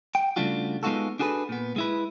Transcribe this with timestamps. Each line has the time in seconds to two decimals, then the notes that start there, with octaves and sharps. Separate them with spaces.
0.15 F#5 G5
0.36 C#3 G3 A3 D4 F4 F#4
0.83 G#3 B3 D#4 F4 F#4 A4
1.19 D4 F#4 G#4 A4 B4
1.49 A#2 B3
1.76 G#3 E4 B4